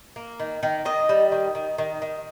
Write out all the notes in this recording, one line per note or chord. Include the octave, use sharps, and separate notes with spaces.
A#3
D#3
D#3
D#3 D#5
G3
D#3
D#3
D#3
D#3